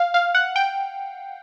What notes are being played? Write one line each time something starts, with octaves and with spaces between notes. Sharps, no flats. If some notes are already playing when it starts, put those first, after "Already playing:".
Already playing: F5
F5
F#5
G5